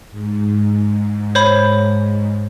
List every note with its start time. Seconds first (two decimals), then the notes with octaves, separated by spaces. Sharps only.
0.11 G#2
1.35 C5 C#5 B5